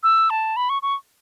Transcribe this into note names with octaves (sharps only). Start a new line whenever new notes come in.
E6
A5
B5
C#6
C#6